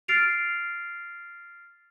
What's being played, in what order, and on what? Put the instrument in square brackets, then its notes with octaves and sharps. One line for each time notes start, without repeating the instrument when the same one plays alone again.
[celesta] F6 A6 C7 D7 F7